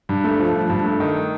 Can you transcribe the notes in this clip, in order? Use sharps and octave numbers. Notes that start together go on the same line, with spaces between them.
G2
A3
F3
G2
G2
A3
D#3